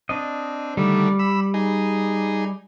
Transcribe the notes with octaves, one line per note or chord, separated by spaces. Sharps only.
C4 D4 D#5
D3 D#3 G3 A3
B5 E6
D#4 G#4